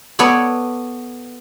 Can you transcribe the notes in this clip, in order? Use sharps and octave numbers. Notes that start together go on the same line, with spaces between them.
B3 A4 C#5 D5